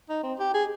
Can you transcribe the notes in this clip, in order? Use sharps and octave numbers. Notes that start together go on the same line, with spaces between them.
D#4
C4
G4
G#4